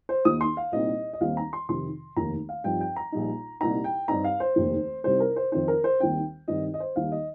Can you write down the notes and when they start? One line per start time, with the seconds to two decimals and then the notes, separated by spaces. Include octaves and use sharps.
0.09 C5
0.25 D#2 D#3 A#3 D#4 D#6
0.41 C6
0.57 F5
0.72 C2 A#2 G3 C4 D#4 D#5
1.13 D#5
1.21 D#2 D#3 G3 C4 F5
1.37 A#5
1.53 C6
1.69 F2 C3 D#3 C6
2.16 F1 D#2 D#3 A#3 D#4 A#5
2.49 F5
2.64 G2 F3 C4 D#4 G5
2.81 G5
2.96 A#5
3.12 A#1 A#2 G3 D#4
3.60 C2 A#2 G3 D#4 A#5
3.84 G5
4.08 G2 G3 C4 D#4 A#5
4.24 F5
4.40 C5
4.56 F1 D#2 D#3
5.04 C2 C3 G3 D#4 C5
5.20 A#4
5.36 C5
5.52 F2 D#3 C4 D#4 C5
5.68 A#4
5.84 C5
6.00 D#2 D#3 G3 C4 G5
6.48 G2 D#3 C4 D#4 D#5
6.74 D#5
6.80 C5
6.96 D#2 D#3 G3 D#4 F5
7.12 D#5